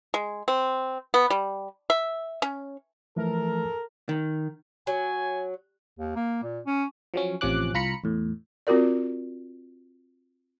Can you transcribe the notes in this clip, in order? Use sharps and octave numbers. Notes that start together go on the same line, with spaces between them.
G#3
C4
B3
G3
E5
C#4
E3 F3 A3 A4 A#4
D#3
F#3 G#5
D#2
A#3
A#2
C#4
F3 F#3 C#4
A1 C3 F3 C#4 D6 F#6
C2 F4 A#5 B5 C#7
E2 A2
C4 F4 F#4 A#4 D5